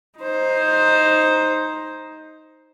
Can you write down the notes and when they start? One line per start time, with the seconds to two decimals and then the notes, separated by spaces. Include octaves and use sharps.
0.19 D#4 C5